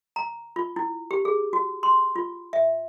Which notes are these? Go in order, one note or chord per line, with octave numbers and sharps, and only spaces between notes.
A#5
F4
E4
G4
G#4
F#4
C6
F4
E5